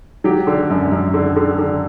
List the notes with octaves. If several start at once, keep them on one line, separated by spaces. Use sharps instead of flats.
F#3 G4
D3
F#2
F#2
D3
D3
D3